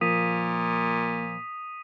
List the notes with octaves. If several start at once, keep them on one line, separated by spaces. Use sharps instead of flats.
A#2 F3 A#3 D#6 B6 D#7